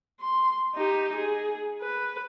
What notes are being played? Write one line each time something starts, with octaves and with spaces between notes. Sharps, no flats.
C6
D#4 G4
G#4
B4